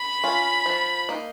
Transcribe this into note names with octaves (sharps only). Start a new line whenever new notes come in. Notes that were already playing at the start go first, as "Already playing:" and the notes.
Already playing: B5
C#4 F4
F3
A#3 D#4